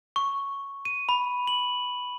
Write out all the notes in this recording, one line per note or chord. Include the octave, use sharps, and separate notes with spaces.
C#6
D#7
B5
F#7